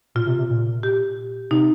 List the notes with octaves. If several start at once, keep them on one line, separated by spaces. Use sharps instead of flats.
A#2 F4
C3
C3
A#2
G4
C3 D#4